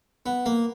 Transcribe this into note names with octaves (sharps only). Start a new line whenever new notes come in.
B3
A#3